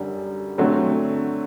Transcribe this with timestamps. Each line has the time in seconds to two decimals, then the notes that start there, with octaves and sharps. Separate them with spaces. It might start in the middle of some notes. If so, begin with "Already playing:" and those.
Already playing: F#2 D3 G3
0.58 D3 F#3 A3 C4